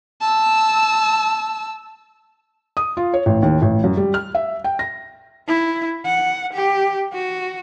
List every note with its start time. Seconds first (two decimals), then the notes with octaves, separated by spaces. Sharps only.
0.21 A5 E6
2.77 D#6
2.97 F4
3.14 C#5
3.26 A1
3.42 D#2
3.62 A1
3.84 F#2
3.97 G3
4.14 F6
4.35 E5
4.64 G5
4.79 A#6
5.48 E4
6.06 F#5
6.54 G4
7.13 F#4